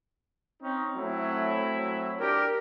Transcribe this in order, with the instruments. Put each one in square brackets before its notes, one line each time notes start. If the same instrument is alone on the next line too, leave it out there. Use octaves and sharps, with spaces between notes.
[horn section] C4 C#4 D#4
[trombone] F#3 [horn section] A3 C4 E4
[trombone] F#3
[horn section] D4 G4 [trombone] A#4